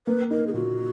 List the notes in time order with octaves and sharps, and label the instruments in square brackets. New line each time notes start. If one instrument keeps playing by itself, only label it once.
[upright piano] A#3 [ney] B4
[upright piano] D#4 [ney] A#4
[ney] G#4
[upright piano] A#2 [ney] F#4